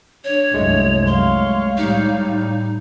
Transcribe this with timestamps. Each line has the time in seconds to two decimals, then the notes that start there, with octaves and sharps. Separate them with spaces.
0.25 D4 C#5
0.54 C2 F#2 G#3 A3
1.06 C#5 F5 C6
1.77 A2 G3 D#4